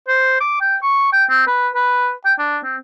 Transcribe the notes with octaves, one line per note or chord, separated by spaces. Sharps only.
C5
D6
G5
C#6
G5
C4
B4
B4
G5
D4
C4